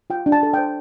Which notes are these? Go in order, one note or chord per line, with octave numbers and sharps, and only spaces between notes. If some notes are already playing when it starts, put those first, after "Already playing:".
F4 G5
D4
A5
A4
C5 G5